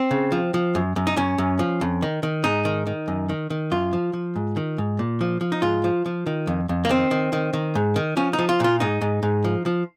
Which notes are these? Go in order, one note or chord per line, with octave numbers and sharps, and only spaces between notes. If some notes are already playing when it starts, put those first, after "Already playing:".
Already playing: C4
C#3
F3
F3
F#2
F#2
D#4
F#2 C#4
F#2
F3
F2
D#3
D#3
G#2 D#4
D#3
D#3
F#2
D#3
D#3
F#2 F4
F3
F3
G#2
D#3
G#2
A#2
F3
F3
D#4
G#2 F4
F3
F3
D#3
F2
F2
A#3
D#3 C4
D#3
D#3
D#3
G#2
D#3
F3 C#4
D#4
F3
F4
A#2 F4
G#2 D#4
G#2
G#2
F3
F3